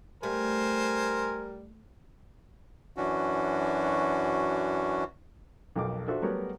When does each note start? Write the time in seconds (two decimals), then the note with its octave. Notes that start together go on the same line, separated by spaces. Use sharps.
0.23 G3 A3 A#4 C5 G#5
2.96 F#2 E3 C#4 D4 F#4
5.76 B1 F2 F#3 A#4 G5 D6
6.08 D4 F4 F#4 A4 C5 E5
6.22 F#3 G3 A3 B3 A#4 C#5